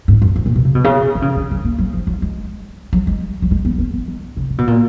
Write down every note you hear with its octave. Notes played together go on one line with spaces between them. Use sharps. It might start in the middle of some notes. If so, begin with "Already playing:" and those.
G#2
F#2
G#2
A#2
B2
C#3
B2
C#3
D#3
C#3
D#3
F#3
A#3
F#3
F3
F#3
G#3
F#3
G#3
F#3
G#3
B3
C#4
B3
D#3
C#3
C#3
B2
A#2